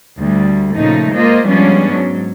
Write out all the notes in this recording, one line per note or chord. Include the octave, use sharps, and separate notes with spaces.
D2 G3
A#2 C#3 F3 A3 D#4
G#3 A#3 F4 C5 D#5
F3 G3 G#3 B3 C#4 D4
G#2 F#3